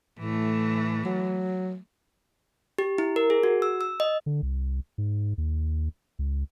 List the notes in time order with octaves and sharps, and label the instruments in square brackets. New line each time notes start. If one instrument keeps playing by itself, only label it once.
[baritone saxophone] A2 [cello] E3 A3
[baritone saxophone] F#3
[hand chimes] G4
E4
A#4
G#4
F#4
E6
E6
D#5
[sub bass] D3
C2
G#2
D#2
C#2